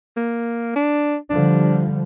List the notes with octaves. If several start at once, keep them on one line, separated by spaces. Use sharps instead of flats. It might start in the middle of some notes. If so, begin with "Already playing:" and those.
A#3
D4
D3 F3 G3 D4